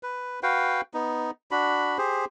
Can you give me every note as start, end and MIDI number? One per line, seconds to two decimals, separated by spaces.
0.03 0.40 71
0.43 0.81 66
0.43 0.81 71
0.43 0.81 77
0.43 0.81 79
0.94 1.31 59
0.94 1.31 63
1.51 1.98 62
1.51 1.98 66
1.51 1.98 83
1.98 2.25 67
1.98 2.25 68
1.98 2.25 72